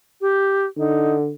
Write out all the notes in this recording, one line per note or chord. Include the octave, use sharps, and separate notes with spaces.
G4
D3 D#4